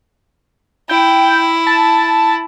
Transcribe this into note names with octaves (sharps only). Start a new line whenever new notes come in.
E4 G5
A5